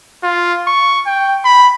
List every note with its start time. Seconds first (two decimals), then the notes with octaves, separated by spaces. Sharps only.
0.24 F4
0.67 C#6
1.06 G5
1.45 B5